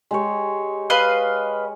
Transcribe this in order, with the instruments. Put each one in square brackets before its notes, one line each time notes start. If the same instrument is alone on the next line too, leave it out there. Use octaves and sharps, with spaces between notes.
[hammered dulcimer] G#3 G4 C#5
[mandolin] B4 D#5 F5